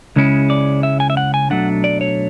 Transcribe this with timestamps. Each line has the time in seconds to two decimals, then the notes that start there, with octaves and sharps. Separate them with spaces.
0.16 C#2 C#3 G#3 C#4 E4
0.50 D5
0.83 E5
1.00 G#5
1.10 E5
1.17 F#5
1.34 G#5
1.50 B1 A2 F#3 A3 D4 F#5
1.84 D5
2.01 C#5